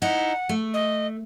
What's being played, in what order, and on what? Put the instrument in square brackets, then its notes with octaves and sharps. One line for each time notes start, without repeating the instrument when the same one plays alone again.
[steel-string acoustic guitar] D#4 E4 [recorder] F#5
[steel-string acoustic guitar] A3
[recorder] D#5